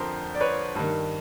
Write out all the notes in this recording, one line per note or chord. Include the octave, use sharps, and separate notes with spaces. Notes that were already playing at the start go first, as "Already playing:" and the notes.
Already playing: F2 D3 F3 A#4 C5
D5
B4 C#5
G2 D#3